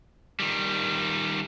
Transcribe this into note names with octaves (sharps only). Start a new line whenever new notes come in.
D#3 G3